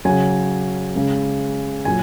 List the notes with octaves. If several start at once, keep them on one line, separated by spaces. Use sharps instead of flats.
C#3 F#3 G#5
C#3 G#3
A#2 F#3 G#5